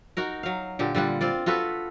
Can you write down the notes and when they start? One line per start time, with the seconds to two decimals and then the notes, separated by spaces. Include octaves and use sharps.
0.17 D#4 F#4 A#4
0.43 F#3 F5
0.79 A#2 D3 G4
0.95 D3 G3 F4 F#5
1.21 C4 F4 D5
1.46 F4 F#4 A4 B4